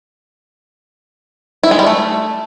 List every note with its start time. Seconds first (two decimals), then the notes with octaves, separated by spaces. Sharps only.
1.63 E4
1.71 G#3
1.79 G3
1.87 A3